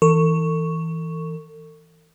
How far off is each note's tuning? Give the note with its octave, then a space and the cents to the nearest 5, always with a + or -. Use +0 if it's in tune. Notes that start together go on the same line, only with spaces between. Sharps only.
E3 -20 A4 +40 C#6 +0